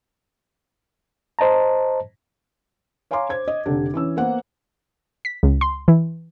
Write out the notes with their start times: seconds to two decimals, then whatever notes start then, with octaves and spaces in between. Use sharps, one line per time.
1.39 C5 D#5 A5 A#5
3.11 C#5 F5 G#5 A#5 C6 D6
3.29 C5 G#6
3.48 D#5
3.65 F1 D3 D4 G4
3.94 E3 C#4 E6
4.17 A#3 B3 C5 F#5
5.25 B6
5.43 C#2
5.61 C6
5.88 E3